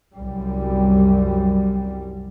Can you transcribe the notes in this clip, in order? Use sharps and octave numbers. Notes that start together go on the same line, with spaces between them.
C2 F#2 G3